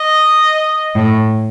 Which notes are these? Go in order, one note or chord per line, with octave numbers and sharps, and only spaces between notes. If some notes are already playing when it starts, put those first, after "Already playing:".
Already playing: D#5
A2